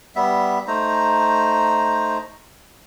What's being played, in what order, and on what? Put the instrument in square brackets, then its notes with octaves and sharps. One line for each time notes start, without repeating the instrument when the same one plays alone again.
[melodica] G3 B3 E5
A3 D#4 C5 A#5